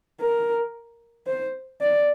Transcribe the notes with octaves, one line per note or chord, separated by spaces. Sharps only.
A#4
C5
D5